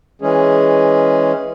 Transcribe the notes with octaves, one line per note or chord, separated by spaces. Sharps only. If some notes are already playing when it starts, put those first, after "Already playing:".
E3 G#3 C#4 G#4